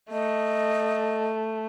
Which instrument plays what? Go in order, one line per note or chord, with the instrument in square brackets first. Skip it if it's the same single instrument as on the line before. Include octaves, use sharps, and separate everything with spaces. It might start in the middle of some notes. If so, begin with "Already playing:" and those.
[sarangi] A3 [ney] D#5